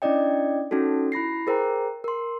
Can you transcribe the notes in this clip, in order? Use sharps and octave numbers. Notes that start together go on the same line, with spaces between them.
C#4 D4 E4 D5 D#5 G5
C#4 D#4 F#4 A4
E4 B5 A#6 C7
G#4 A#4 C5 G5 A#5
A#4 C6